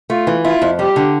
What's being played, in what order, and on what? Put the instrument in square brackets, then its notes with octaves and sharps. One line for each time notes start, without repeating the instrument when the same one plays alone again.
[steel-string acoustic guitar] A3 [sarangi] F4
[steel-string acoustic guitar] E3
[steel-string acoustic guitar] E4 [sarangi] F4
[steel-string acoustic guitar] F2
[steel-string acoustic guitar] G3 [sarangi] G4
[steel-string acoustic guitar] D3